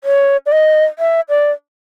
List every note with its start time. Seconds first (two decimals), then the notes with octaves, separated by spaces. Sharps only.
0.04 C#5
0.46 D5
0.52 D#5
0.99 E5
1.29 D5